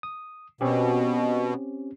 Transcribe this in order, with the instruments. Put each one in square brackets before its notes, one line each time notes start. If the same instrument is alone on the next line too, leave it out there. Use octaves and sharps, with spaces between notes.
[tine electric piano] D#6
[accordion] B2 [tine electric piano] C4 C#4 G4